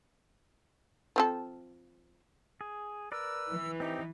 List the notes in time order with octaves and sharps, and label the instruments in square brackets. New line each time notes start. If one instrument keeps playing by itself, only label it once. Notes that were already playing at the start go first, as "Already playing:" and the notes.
[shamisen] F3 C4 A4
[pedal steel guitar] G#4
[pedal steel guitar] A#4 B4 D5 [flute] E6
[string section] E3
[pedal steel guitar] C4 G4 [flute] D#4